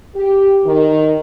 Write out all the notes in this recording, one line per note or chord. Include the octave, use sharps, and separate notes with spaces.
G4
D#3